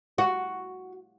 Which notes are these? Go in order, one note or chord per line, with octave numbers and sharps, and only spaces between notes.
F#4